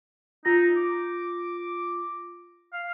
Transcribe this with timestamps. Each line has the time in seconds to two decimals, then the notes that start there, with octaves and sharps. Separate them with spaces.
0.45 D#4 F4 A#6
0.76 D6
2.73 F5